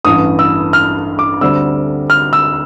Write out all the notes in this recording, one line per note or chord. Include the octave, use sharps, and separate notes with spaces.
A1 G2 E3 D#6
E6
F6
D6
D2 D3 G3 C4 E6
F6
E6